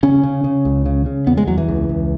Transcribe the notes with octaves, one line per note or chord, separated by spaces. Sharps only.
C#3 C#4
C#3
C#3
C#2
C#3
C#3
E2 B3
G#3
E2 F#3
E3
C#2
C#2